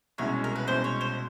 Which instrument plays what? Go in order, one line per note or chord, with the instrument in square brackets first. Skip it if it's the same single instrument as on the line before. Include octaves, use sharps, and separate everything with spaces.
[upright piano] C2 B2 G#3 C#4 [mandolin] C#5
[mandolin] A#4
B4
[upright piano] C2 B2 G#3 C#4 [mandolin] C5
[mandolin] C#5
C5